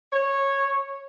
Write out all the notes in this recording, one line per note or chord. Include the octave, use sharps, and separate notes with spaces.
C#5